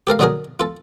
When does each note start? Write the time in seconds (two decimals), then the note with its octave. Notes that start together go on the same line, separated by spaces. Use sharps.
0.07 G4 A4 A#4 F5
0.19 D3 F#3 D#4 F#4 G#4 A#4
0.60 F4 A4